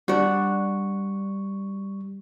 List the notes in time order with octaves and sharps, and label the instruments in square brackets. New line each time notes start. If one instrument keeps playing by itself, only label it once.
[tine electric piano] G3 C#6 [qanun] D4 F#4